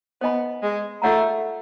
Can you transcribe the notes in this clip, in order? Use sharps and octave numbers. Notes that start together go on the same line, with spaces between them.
B3 C5 D#5 G#5 B5
G#3
A3 F4 A4 C#5 F#5 A#5